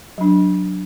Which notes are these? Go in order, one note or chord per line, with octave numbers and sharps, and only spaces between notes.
F#3 D4